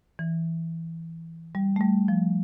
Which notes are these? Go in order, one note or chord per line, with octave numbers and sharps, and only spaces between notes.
E3
G3
A3
G3
F3